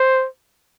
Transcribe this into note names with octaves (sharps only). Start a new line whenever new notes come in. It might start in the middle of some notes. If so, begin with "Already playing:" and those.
Already playing: C5